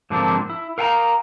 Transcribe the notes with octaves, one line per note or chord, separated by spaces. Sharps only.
G#2 D3 F3 A#3 C4 D4
E4
A#4 F5 G5 G#5 A#5